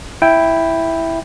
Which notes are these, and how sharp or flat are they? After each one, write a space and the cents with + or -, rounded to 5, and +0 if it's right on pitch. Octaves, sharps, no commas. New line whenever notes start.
E4 +0 G5 +0